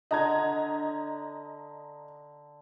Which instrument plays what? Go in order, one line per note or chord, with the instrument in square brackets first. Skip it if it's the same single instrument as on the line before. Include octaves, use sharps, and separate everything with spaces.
[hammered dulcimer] D3 [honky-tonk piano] D#5 A#5 G#6